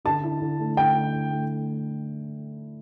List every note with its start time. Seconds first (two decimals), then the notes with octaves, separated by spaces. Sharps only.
0.05 D3 A5
0.23 E4
0.41 D3
0.60 A3
0.77 D3 G5
0.95 E4
1.13 D3
1.31 A3